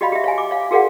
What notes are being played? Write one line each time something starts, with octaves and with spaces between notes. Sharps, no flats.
F#4 G4 D5 D#5 F5 B5
G4 E5
C#5 F5 G#5
D6
C#5 F5
F#4 G#4 A#4 D5 F5 F#5